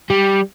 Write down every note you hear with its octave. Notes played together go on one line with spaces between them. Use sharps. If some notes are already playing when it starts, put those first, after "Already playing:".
G3